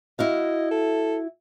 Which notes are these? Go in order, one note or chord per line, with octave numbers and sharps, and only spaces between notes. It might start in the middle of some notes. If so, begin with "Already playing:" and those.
E4 F#4 D#5 F5
A4